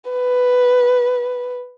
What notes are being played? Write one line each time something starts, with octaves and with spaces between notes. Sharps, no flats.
B4